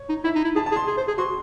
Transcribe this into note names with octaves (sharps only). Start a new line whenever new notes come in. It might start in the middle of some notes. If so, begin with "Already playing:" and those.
Already playing: C#5
D#4
E4 E5
D#4
E4
G#4 A5
A5
G#4
C6
G#4
C5
G#4
F#4 C6